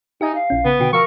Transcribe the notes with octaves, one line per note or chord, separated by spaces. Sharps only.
D#4 G4 E5 G#5
F5
A#1 C#4
C#3 B3
B2 D3 F#4 G5
F3 A#4 F5 C#6 E6